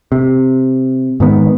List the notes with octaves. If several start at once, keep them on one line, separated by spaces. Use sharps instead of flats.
C3
G#2 D#3 B3